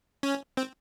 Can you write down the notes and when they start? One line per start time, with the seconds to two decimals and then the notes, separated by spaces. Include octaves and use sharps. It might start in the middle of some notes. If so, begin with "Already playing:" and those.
0.23 C#4
0.57 C4